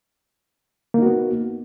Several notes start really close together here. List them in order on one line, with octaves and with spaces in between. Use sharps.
A#3 D#4 F#4 B3